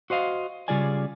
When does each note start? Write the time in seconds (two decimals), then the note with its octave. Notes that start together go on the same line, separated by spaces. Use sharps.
0.10 F#4 C5 D#5 F5
0.68 C#3 G3 F4 G#4 D5 G#5